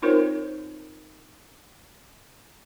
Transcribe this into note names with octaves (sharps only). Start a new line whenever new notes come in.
C4 D#4 F4 A#4 C5 C#5